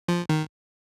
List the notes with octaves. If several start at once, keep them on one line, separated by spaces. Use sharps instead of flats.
F3
D#3